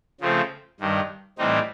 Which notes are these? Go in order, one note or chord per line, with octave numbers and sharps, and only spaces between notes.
C#3 F3 A3 C4
G2 D#3 G3
A2 E3 G3 C4 D#4